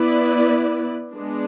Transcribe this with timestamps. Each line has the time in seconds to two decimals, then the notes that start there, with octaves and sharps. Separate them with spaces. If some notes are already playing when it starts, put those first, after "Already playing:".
Already playing: B3 E4 B4 D5
1.15 G#3 B3 D4